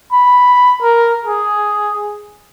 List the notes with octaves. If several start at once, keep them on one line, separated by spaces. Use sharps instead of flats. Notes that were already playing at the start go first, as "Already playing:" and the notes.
B5
A#4
G#4